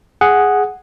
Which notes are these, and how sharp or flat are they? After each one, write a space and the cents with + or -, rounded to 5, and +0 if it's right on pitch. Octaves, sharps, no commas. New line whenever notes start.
G#4 +0 F#5 +0